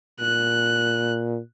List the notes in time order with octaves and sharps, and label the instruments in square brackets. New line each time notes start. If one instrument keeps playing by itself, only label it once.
[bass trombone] A#2 [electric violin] F#6